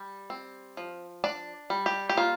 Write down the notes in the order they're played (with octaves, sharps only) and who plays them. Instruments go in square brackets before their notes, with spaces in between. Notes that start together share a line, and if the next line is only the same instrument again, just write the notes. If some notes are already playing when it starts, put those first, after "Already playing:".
Already playing: [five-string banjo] G3
C4
F3
D4 D5
G3
G4
G4
A#3 F4